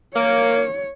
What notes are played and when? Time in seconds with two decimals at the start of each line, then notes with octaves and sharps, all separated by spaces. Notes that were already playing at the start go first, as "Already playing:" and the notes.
0.15 A#3 C#5